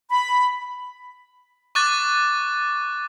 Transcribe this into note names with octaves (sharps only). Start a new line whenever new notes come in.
B5
C#6 D6 F#6 A6